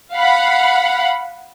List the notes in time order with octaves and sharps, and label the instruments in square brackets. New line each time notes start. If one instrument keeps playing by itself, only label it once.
[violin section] F5 F#5 B5